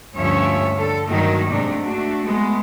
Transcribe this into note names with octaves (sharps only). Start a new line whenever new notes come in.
D2 G2 F3 C#4 C#5 E5
D3 A4
G2 D#3 F#3 A3 D#4 F#4
G#2 C3 A3 D4 D#4
A3 D4 F#4
G#3 A3 B3